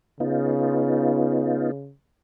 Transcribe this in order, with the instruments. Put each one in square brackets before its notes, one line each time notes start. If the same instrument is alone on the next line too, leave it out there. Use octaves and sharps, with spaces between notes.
[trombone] C#3 [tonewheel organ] B3 D#4 F4